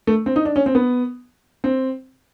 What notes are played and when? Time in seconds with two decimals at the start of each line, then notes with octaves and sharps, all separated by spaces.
0.07 A3
0.26 C4
0.36 D#4
0.45 D4
0.56 C#4
0.66 C4
0.75 B3
1.64 C4